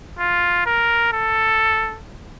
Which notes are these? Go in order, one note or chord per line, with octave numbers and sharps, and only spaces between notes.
F4
A#4
A4